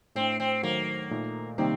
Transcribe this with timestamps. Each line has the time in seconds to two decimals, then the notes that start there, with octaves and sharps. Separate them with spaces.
0.15 A2 A3 C4 D4
0.40 C4
0.63 D#3 F#3 A3 A#3
1.11 A#2 A3 D#4
1.58 C3 D#3 G3 A#3 C4 D#4